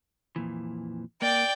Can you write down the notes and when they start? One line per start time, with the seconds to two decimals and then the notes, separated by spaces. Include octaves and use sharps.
0.36 F2 A#2 E3
1.22 A#3 D5 G5